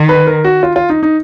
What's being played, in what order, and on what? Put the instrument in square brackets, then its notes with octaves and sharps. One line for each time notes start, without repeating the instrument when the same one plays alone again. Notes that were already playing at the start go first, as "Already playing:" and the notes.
Already playing: [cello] D#3
[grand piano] B4
A#4
F#4
F4
F4
D#4
D#4